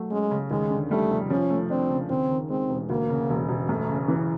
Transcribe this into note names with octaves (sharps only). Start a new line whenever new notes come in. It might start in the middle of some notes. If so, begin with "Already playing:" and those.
Already playing: F#3 A3
G#3 C#4
C#3
D#2 G#3
D3
G3 A3
F1
F3 C#4
A3
C4 D4
C#3
D#2 C4
D#3
G#3 C4
E1
D2 A#3
C#3
E1
E1
F#2 A3
C#3
E3